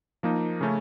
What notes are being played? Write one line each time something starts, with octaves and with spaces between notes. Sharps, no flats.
F3 A#3 D#4
C#3 A3 C#4